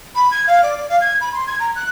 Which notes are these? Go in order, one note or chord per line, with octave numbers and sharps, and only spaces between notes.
B5
G#6
F5
D5
D5
F5
G#6
B5
C6
G#6
A#5
F#6